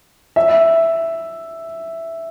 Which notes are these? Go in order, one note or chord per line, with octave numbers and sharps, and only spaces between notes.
E5